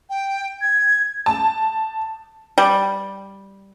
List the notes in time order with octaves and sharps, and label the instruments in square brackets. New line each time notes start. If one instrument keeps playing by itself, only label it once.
[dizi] G5
G#6
[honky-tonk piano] A5
[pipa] G3